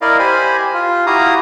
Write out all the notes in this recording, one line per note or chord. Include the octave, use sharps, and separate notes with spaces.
E4 A#4 D5 D#5 F5
G4 C5 G#5 B5
F4
E4 F#4 G4 F5 A#5 D#6